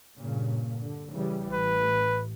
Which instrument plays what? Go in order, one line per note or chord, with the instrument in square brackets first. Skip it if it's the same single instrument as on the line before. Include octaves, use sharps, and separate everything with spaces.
[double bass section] G2 A#2 C#3
D3
C#3 E3 G3
[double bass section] A1 [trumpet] B4